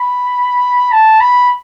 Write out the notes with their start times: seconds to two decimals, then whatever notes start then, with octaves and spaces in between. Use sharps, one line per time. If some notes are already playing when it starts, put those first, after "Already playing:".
Already playing: B5
0.92 A5
1.21 B5